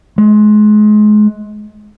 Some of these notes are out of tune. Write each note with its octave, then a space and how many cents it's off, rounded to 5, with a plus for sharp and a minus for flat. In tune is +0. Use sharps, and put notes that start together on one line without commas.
G#3 +30